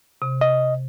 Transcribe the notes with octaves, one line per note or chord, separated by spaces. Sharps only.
C3
D#5